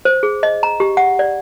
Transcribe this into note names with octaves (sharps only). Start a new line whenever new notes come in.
C5
G#4
D#5
A#5
G4
F#5
D5